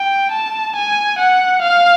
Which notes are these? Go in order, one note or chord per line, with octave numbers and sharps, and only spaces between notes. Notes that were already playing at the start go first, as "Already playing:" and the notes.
Already playing: G5
A5
G#5
F#5
F5